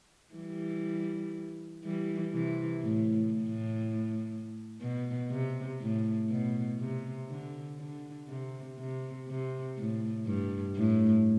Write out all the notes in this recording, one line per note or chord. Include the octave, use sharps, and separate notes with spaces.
E3 G3
E3 G3
C3 E3
A2
A2
B2
C3
A2
B2
C3
D3
D3
C3
C3
C3
A2
G2
A2